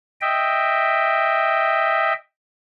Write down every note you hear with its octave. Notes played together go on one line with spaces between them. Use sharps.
D#5 E5 G5